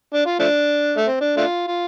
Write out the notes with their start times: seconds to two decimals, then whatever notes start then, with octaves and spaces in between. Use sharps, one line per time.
0.14 D4
0.26 F4
0.39 F3 A3 D4
0.97 A3
1.06 C4
1.20 D4
1.37 A3 D4 F4
1.67 F4